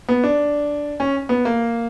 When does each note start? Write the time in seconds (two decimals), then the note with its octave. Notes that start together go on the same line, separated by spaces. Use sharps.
0.09 B3
0.24 D4
1.00 C#4
1.29 B3
1.45 A#3